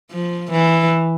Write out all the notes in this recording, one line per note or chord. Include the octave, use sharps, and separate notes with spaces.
F3
E3